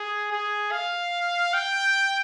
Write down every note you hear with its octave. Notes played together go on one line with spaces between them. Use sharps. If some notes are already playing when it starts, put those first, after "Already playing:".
Already playing: G#4
G#4
F5
G5